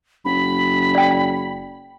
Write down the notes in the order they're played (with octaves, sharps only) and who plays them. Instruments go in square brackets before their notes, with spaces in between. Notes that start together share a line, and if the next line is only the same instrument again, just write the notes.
[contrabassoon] F#1 [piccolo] B5
[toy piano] D5 G5